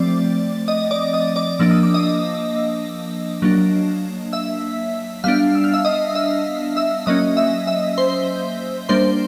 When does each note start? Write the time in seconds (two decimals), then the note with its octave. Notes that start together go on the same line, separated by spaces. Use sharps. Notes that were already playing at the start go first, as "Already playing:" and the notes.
Already playing: F3 A3 C4 D5 D6
0.68 D#5 D#6
0.91 D5 D6
1.13 D#5 D#6
1.36 D5 D6
1.59 F3 A#3 D4 E6
1.71 D#6
1.83 D6
1.94 D#5 D#6
3.42 F#3 A#3 D4
4.33 E5 E6
5.24 G3 B3 D4 F5 F6
5.55 E6
5.64 F6
5.74 E5 E6
5.85 D#5 D#6
6.15 E5 E6
6.77 E5 E6
7.06 F#3 A#3 C#4 D#5 D#6
7.37 E5 E6
7.67 E5 E6
7.98 C5 C6
8.89 G3 A#3 D4 C5 C6